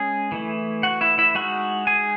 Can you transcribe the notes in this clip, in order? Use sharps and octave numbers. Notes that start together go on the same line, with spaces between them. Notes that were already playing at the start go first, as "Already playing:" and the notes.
Already playing: G#3 C#4 G#4 G#5
E3 A3 E4
F#4 F#5
E4 E5
E4 E5
G#3 D#4 F#4 F#5
G#4 G#5